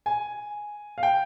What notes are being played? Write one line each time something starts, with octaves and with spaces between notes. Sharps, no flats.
G#5
F5
G5